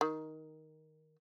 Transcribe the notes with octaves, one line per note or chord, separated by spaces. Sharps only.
D#3